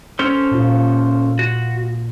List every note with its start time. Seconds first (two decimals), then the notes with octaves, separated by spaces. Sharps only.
0.19 C#4 A4 C5
0.52 A#2 F4
1.39 F#4